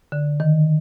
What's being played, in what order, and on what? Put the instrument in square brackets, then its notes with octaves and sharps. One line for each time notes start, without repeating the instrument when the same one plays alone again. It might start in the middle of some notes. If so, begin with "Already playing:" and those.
[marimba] D3
D#3